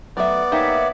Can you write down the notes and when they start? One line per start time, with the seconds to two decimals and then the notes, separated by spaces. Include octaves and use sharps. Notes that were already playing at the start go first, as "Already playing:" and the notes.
0.17 F#3 A3 B3 D5 E5
0.52 A#3 D#4 G4 C#5 E5